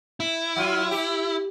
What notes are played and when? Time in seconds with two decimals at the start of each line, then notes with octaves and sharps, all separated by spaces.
0.20 E4
0.56 F#3 F4
0.91 G4